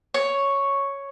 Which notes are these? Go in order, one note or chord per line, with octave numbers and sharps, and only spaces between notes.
C#5